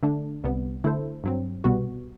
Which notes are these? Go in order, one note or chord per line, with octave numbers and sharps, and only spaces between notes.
D3 A3 D4
C2 C3 G3 B3
D3 A3 E4 A4 C5
G2 F#3 C4
C2 B2 G3 B3 F#4